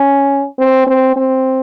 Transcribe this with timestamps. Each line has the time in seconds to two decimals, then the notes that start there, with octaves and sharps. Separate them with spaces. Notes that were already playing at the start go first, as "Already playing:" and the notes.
Already playing: C#4
0.59 C4
0.87 C4
1.16 C4